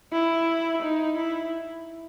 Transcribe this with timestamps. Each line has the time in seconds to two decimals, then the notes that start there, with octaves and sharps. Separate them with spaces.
0.12 E4
0.83 D#4
1.17 E4